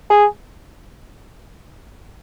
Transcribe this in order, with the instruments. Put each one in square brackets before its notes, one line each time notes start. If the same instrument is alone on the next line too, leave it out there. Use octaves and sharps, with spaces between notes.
[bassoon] G#4